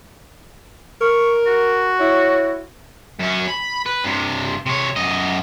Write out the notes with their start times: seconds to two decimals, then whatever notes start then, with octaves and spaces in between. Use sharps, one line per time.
1.01 A#4 C#6
1.47 F#4
2.00 E4 C#5
3.19 F#2 C#4
3.48 B5
3.86 B4
4.04 G2 C3
4.66 C3 C#5
4.96 F#2 D#5